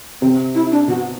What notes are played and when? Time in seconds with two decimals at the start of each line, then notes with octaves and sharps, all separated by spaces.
0.21 C3 C4
0.55 E4
0.71 D4
0.88 B2 F#4